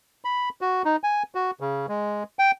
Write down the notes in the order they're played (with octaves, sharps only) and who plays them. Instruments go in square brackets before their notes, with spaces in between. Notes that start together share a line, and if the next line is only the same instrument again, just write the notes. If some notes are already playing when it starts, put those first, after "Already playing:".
[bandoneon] B5
F#4
D#4
G#5
F#4
C#3
G#3
G5